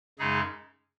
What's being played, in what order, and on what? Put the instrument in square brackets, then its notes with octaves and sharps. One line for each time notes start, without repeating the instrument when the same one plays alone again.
[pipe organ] F#2 C#3 G#3 D#4 G#4